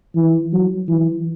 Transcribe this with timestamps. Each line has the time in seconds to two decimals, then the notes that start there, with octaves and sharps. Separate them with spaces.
0.16 E3
0.53 F#3
0.88 E3